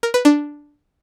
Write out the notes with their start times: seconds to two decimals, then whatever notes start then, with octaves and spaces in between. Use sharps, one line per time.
0.03 A#4
0.14 B4
0.25 D4